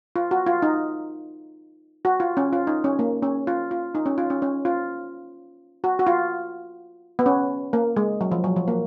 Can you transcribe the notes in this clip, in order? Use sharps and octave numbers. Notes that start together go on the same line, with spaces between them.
F4
F#4
F4
D#4
F#4
F4
C#4
F4
D#4
C#4
A#3
C#4
F4
F4
D#4
C#4
F4
C#4
C#4
F4
F#4
F#4
F4
B3
C#4
A#3
G#3
F#3
F3
F#3
F3
A#3